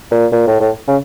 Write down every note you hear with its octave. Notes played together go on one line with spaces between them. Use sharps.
A#2
A#2
A2
A2
C#3